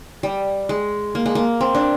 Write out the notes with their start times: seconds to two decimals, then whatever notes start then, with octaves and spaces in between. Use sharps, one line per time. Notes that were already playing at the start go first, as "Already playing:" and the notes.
0.23 G3
0.69 G#3
1.15 A#3
1.26 G#3
1.35 A#3
1.61 C4
1.75 D4